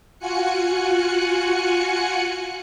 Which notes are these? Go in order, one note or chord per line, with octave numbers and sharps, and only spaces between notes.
F4 F#4 G#5 F#6 C#7